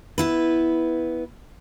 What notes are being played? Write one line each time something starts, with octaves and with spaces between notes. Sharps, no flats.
B3 E4 B4